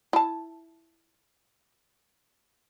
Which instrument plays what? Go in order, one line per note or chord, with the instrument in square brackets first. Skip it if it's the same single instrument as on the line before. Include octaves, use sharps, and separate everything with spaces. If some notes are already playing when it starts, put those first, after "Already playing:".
[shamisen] E4 A5